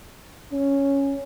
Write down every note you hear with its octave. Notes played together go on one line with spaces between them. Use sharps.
C#4